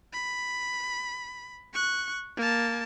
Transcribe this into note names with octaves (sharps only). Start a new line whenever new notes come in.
B5
C#6 F#6
A#3 A5